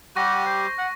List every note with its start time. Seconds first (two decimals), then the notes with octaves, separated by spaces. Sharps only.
0.16 G3 G4 F#5 C#6 A#6
0.46 C5
0.78 F#5